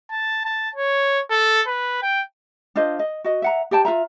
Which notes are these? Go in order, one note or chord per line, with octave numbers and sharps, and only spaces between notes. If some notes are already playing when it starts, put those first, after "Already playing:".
A5
A5
C#5
A4
B4
G5
D4 F4 C5 D#5
D#5
F#4 D#5
E5 F#5 A#5
G4 D5 G5 A5
F4 B4 E5 A#5